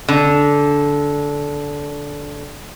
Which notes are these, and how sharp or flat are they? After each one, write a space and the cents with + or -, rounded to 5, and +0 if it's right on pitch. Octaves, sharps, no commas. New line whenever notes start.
D3 -15